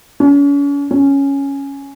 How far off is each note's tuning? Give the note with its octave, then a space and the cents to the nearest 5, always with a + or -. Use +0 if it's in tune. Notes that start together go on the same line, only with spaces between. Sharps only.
C#4 +40
C#4 +0